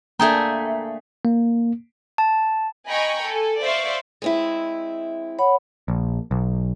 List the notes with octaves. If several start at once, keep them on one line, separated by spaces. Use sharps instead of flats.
A3 A#3 D4 G#4 A4 G5 A#5
A#3
A5
D#5 G5 G#5 A#5 B5 C#6
A4 G#5
C5 D5 E5 F5 C6 C#6
G#3 C4 E4
C#5 F#5 B5
A#1
B1